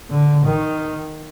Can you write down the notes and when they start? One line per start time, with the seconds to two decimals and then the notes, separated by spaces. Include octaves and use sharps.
0.10 D3
0.44 D#3